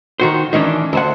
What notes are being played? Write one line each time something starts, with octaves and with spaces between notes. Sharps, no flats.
D#3 F#4 C5
D#3 E3 C#4 D4
D2 C5 F#5